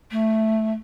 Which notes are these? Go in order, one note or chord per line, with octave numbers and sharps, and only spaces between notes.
A3